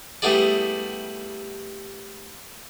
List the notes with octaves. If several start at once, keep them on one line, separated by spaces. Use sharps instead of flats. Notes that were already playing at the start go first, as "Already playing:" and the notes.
G3 A3 B3 E4 G#4 D5